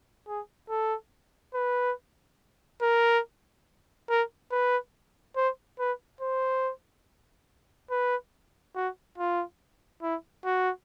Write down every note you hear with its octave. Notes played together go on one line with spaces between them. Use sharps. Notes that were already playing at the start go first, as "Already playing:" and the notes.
G#4
A4
B4
A#4
A#4
B4
C5
B4
C5
B4
F#4
F4
E4
F#4